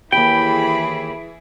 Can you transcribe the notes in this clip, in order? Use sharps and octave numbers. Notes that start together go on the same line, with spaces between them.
D#2 E3 E4 G4 G#4 G5 B5